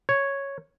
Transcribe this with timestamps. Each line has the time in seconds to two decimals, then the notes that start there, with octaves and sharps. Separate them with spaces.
0.09 C#5